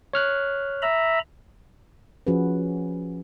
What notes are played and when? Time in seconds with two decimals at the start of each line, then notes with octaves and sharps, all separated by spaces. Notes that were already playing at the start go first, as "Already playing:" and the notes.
0.13 C#5 F6 F#6
0.82 E5 A#5 B5
2.27 F3 C#4 F#4 G#4 B4